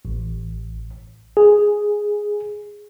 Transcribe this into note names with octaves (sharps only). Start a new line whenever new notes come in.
A1
G#4